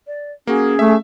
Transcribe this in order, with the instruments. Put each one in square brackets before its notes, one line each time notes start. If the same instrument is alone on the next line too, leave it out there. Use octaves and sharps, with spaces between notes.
[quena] D5
[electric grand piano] A#3 F#4 [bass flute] C#4 [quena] G#4
[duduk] A3 [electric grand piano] E5